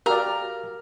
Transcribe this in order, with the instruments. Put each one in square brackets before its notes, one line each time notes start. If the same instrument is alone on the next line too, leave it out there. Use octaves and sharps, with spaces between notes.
[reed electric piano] F#4 F5 [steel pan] G4 D5 [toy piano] A#4 [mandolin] A#5 F6